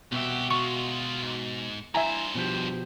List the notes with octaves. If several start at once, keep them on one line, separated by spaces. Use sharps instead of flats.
C2 B2 F#4 G4 E5
G#3 F4 C#6
G#2
G2 E4 C5 E5 G#5 A#5
B2 F3 G4